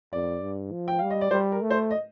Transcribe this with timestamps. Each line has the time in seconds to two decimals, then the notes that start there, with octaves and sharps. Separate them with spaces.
0.13 F2 D5
0.42 G2
0.72 F3
0.88 G5
0.99 G3 F5
1.10 D#5
1.21 D5
1.31 G3 C5
1.52 A#4
1.61 A3
1.70 C5
1.91 D#5